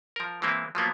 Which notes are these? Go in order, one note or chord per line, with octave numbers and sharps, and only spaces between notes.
F3 A#4
E3 G#3 A#3 C4 E4
F3 F#3 A#3 B3